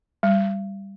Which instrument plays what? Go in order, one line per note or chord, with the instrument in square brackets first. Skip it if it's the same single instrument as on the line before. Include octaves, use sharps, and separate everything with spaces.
[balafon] G3